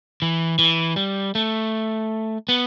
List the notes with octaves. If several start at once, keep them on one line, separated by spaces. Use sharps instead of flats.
E3
E3
G3
A3
B3